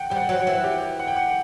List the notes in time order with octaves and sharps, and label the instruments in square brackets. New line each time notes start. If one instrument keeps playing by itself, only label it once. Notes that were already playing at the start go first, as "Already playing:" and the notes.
Already playing: [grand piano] F#5 G5
[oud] G3 [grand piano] G5
[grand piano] F#5
[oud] F#3
[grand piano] F#5
[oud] E3
[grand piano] G4
F#5
G5
F#5